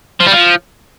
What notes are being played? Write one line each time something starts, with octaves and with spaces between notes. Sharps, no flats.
F3
G3
F3